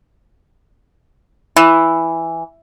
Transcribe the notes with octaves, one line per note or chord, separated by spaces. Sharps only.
E3